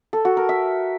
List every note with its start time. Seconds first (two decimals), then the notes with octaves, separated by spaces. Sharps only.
0.13 A4
0.25 F#4
0.37 A#4
0.49 E5